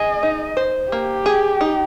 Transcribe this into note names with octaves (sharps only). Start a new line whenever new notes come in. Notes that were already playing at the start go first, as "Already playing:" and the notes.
Already playing: G#4 D#5
D#4
C5
A#3 G4
G#4
D#4